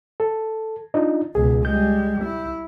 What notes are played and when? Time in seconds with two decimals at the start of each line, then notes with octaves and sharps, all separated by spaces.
0.20 A4
0.94 D4 D#4 F4
1.35 C#2 B2 G#4
1.65 G3 G#3 G6
2.24 E4